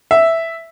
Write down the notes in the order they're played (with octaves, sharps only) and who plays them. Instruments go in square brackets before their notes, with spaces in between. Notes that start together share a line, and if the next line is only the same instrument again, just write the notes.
[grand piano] E5